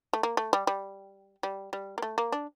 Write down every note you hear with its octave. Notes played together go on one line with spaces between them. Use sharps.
A3
A#3
A3
G3
G3
G3
G3
A#3
A3
A#3
D4